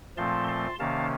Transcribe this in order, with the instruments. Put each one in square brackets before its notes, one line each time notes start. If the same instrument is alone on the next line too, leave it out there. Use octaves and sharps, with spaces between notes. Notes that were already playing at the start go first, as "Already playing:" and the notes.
[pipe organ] A#2 F3 A3 C4 A5 C6
A5 C6
C3 D#3 A#3 C#4 F5 A5